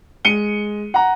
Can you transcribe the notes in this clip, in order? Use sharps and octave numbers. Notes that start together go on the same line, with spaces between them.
G#3 C#7 D#7 G7
F#5 A#5